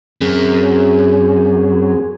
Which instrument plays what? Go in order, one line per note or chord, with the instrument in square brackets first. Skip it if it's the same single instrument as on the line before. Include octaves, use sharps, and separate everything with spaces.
[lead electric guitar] F#2 [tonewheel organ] C4 G#4